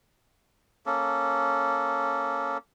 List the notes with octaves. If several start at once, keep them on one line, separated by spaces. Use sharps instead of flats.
A#3 C#4 A4